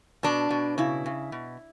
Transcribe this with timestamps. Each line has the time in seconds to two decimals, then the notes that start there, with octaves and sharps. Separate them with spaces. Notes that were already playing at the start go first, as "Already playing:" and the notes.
0.23 B2 D4
0.50 B2
0.78 C#3 E4
1.06 C#3
1.32 B2